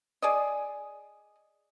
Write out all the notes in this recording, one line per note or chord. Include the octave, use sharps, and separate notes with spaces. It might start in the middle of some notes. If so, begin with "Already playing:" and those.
G#4 D5 D#5